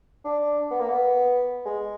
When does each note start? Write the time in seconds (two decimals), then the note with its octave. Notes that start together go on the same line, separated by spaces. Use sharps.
0.25 D4
0.71 B3
0.80 A#3
0.89 B3
1.65 G#3